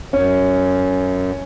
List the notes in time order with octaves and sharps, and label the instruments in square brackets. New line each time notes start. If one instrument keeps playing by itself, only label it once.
[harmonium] F#2 [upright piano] C#4